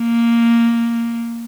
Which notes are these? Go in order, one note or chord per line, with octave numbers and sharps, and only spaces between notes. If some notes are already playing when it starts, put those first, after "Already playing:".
Already playing: A#3